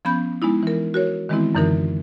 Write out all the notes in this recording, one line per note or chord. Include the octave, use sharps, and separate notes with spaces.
F3 B3 C#4 B5 G6
G#3 B3 D#4 E4
E3 A#4
F#4 A#4 C#5
D#3 E3 G#3 B3 C4 E4
F#2 D3 E3 D#4 A#4